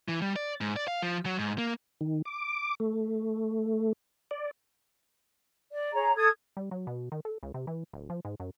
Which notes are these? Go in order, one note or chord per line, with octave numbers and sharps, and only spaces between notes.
E3
G3
D5
G#2
D5
F5
F3
F#3
G#2
A#3
D#3
D6
A3
D5
D5
G#4 C#5 A#5
A4 D#6 G#6
G3
F#3
B2
D#3
A4
C#2
C3
E3
D1
F3
G#2
F#2